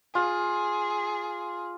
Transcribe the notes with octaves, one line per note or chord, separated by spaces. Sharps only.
F4 G#4